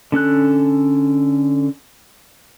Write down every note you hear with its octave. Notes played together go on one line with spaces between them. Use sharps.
D3 C#4 A4 F#6